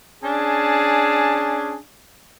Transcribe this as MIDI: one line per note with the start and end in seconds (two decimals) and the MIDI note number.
0.23 1.78 61
0.23 1.78 62
0.23 1.78 68
0.23 1.78 81